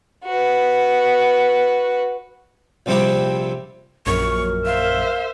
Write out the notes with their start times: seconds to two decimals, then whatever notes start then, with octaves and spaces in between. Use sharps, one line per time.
0.25 F#4 B4
2.86 A#1 C3 G3 C4 E4 G4
4.06 A#1 F#2 A#4 C#6
4.66 C5 E5 F5